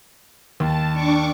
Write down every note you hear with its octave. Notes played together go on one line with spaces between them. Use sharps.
D#2 A5
D4 C#6 D6